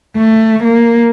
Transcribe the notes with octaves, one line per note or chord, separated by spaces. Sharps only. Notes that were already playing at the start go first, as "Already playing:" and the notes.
A3
A#3